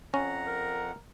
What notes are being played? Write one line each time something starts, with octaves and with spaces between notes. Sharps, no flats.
F2 C#4 F#5 A#5
A#4